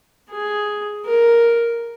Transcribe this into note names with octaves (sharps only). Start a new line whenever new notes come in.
G#4
A#4